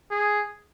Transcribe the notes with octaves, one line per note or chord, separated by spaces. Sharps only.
G#4